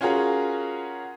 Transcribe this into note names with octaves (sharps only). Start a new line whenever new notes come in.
C#4 F4 F#4 G#4 A#4